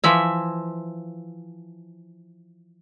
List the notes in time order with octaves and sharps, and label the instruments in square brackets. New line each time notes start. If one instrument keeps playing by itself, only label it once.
[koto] E3 F3 E5